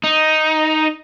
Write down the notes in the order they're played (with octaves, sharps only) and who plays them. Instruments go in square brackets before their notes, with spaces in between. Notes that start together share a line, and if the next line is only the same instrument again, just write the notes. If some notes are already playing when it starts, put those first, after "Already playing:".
[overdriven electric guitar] D#4